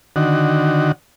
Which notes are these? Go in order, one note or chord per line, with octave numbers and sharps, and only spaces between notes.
D3 D#3 F#4